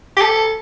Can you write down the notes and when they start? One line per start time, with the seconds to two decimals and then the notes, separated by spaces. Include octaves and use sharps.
0.17 G4
0.22 A4